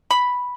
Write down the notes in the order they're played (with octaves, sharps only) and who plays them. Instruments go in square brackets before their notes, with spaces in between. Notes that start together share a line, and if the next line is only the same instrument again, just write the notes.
[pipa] B5